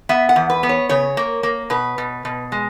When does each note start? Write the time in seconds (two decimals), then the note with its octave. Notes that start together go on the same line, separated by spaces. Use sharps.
0.09 B3 E5
0.29 F#5
0.36 E2
0.50 B4
0.63 B3
0.69 C#5
0.89 C#3 C#5
1.17 A#3
1.43 A#3
1.70 B2 B4
1.98 B2
2.25 B2
2.52 G#3